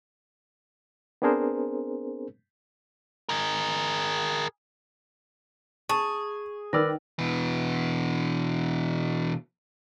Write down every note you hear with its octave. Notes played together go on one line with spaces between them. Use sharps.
B3 C4 D4 G#4 A#4 C5
G#4 A#4
G#4 A5 C#6
D#3 A#4 B4 D5 E6 F6 A#6
B2 E3